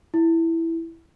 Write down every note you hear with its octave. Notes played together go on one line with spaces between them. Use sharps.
E4